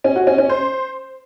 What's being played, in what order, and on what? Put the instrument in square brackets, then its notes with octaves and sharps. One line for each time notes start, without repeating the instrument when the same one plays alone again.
[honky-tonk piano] C#4
F#4
C#4
C#4
C5